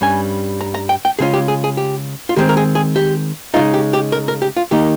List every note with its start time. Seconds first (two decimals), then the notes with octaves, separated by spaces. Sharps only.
0.01 G2 G3 C#4 G#5
0.61 A#5
0.75 A#5
0.89 G5
1.05 G5
1.19 C#3 G#3 C#4 F4 G#4
1.34 G4
1.48 G#4
1.64 G#4
1.77 G4
2.29 F4
2.36 D#3 G#3 C4 G4
2.49 A#4
2.57 G#4
2.75 G#4
2.96 G4
3.54 C#3 G#3 D#4 F4
3.74 G4
3.93 G4
4.12 A#4
4.28 A#4
4.42 G4
4.56 F4
4.71 D#3 A#3 D#4 G4